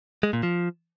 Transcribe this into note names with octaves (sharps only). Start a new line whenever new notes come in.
G#3
A#2
F3